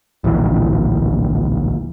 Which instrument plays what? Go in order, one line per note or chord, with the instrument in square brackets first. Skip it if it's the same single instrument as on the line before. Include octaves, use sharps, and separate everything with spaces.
[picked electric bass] D1 A#1 E3